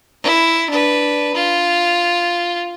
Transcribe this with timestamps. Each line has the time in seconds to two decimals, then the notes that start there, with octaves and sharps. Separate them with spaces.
0.23 E4
0.70 D4 B4
1.34 F4